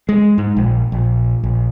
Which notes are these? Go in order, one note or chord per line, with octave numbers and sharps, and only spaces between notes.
G#3
G#2
A#1
A#1
A#1